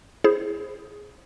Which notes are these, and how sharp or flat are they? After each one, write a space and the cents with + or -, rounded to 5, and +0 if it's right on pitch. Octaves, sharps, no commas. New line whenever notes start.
E4 +10 G#4 +0 C5 +5